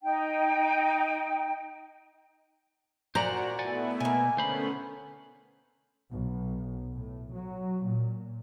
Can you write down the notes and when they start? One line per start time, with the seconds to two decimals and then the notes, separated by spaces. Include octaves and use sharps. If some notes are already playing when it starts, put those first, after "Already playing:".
0.03 D#4 G5
3.15 A#2 F#4 C5 D5 F#5 A#5
3.59 A3 B3 E4 D5 F#5 G#5
4.00 B2 A#3 G#5
4.37 D2 A3 B3 C#4 C5 B5
6.12 B1
6.93 A2
7.33 F#3
7.82 A#2